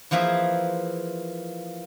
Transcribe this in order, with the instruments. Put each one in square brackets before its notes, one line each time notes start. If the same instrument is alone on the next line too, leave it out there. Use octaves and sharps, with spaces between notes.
[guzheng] E3 F3 A#3 G#4 E5